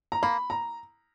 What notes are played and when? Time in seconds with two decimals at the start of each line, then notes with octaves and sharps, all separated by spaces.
0.12 A#5
0.23 A#3 B5
0.50 A#5